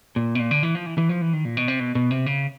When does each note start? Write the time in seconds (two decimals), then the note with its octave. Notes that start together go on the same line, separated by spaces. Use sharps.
0.16 A#2
0.35 B2
0.39 A#2
0.51 D3
0.63 E3
0.75 F3
0.86 E3
0.98 E3
1.09 F3
1.21 E3
1.33 D#3
1.45 A#2
1.57 B2
1.68 C3
1.80 B2
1.95 B2
2.11 C3
2.26 C#3